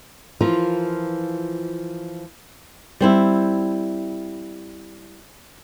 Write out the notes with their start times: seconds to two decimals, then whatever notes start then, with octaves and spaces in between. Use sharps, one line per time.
0.41 E3 F3 F4 A#4
3.01 G3 C4 E4